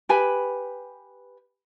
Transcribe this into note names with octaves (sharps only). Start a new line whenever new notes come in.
G4 B4 G#5 B5